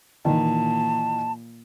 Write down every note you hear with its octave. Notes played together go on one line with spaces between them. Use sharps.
A#2 D#3 E3 A5